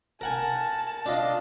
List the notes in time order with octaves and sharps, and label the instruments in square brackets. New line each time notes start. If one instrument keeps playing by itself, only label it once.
[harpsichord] A#4 F#5 G#5 [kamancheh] A5
[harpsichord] D4 F4 D#5